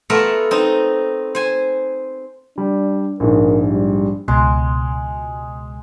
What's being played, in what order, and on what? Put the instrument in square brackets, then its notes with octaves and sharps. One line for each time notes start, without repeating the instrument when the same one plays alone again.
[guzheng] A3 B3 F4 A#4 E5
C4 D#4
C5 G#5
[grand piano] G3 [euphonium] D4
[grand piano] A#1 G#2 [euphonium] A#4
[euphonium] G3
[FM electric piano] C#2 B2 [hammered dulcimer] G#3